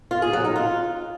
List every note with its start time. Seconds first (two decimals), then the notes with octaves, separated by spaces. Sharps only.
0.11 F4
0.22 G#4
0.33 F#3
0.44 D#4
0.56 F4